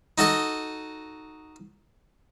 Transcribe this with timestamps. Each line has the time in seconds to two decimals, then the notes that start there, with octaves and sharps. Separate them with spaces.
0.18 D#4 F#4 A4 D#5